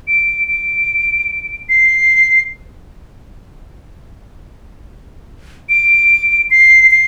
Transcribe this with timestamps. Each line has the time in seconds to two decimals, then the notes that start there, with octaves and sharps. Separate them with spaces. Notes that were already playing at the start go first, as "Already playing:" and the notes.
0.08 D7
0.48 D7
1.69 C7
5.69 D7
6.51 C7
6.91 C7